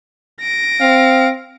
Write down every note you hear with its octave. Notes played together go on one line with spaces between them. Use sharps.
A#6 D7
C4 F5